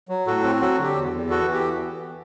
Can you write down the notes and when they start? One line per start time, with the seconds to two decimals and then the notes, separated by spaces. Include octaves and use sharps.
0.09 F#3
0.26 A2 F#4 A4
0.44 C4
0.61 F#3 F#4 A4
0.78 D3
0.83 G4
0.95 E2
1.13 E2
1.30 B3 F#4 A4
1.47 E3
1.53 G4